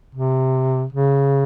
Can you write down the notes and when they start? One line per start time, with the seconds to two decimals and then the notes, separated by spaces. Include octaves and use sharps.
0.15 C3
0.93 C#3